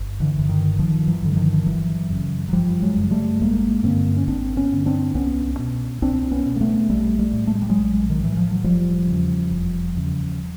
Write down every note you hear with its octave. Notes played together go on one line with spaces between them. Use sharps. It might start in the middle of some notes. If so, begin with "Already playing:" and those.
Already playing: G1
D3 E3
G2 D3
D#3
G1 D#3 F3
E3 F#3
G2 D3
F#3
D#3 F3
G1 E3 F#3
F#2 C#3
F#3
G1 F3 G3
F#3 G#3
F#2 C#3
G3 A3
G#1 G#3 A#3
G2 D3 A#3 C4
C#4
G#1 C4 D4
B3 C#4
G2 D3
C4 D4
C2 B3 C#4
B2
C2 C4 D4
B3 C#4
B2
A#3
A3 B3
A#1 G3 A3
G3 A3
A2
A3
G#3
G3
F#3 G#3
A#1
D#3
A2 E3
F3
F#3
F1 F3 G3
E2 C#3
F1
E2 C#3